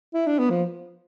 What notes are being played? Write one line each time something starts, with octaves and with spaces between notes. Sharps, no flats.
E4
D4
B3
F3